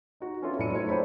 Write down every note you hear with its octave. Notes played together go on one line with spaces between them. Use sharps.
D#4 F#4
B3 C#4 D4 F4 A4 E5
A2 F#3 B4 D5 C#7 D#7
A3 C4 D#4 F4 A4 C#5
C4 C5 D5 E5 B5